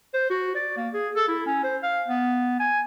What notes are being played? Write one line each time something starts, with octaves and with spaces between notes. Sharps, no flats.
C5
F#4
D5
A#3
G#4
A4
E4
C#4
C5
F5
B3
G#5